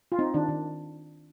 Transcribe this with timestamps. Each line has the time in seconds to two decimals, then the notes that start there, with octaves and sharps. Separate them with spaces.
0.12 F4
0.19 C4 D#4
0.34 D#3 D4
0.48 D#3